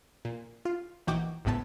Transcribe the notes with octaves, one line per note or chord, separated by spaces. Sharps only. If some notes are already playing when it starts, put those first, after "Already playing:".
A#2
F4
A#1 E3 D#4 F#4 G5 D6
G#1 C#2 A2 B3 A5